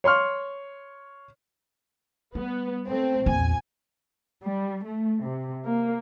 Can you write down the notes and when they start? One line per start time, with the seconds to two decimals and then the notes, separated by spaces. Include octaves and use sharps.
0.04 C#5 C6 C#6 F6
2.35 G3 B3
2.87 A3 C4
3.26 A#1 E2 G#5
4.42 G3
4.85 A3
5.22 C3
5.65 A#3